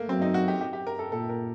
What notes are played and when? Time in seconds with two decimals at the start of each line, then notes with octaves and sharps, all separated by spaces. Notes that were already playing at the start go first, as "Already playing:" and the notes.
Already playing: A3 A#3
0.09 F#3 C4
0.22 D#4
0.34 F#4
0.48 G4
0.61 G4
0.73 G4
0.87 A#4
0.99 A4
1.12 A#2 A4
1.30 A#4